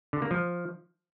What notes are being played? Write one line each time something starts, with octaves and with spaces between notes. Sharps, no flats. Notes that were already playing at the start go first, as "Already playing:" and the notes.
D3
A#3
F3